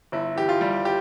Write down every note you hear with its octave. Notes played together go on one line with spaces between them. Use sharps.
G1 E4
E3 G4
F4
G3
G4